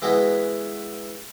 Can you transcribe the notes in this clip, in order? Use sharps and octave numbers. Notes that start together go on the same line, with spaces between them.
E3 G#3 B3 E4 F#4 B5